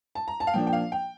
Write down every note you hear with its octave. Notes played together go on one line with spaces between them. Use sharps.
A5
A#5
A5
F5
A#2 F3 A#3 D4 G5
G5
F5
G5